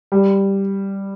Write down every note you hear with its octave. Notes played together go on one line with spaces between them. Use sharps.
G3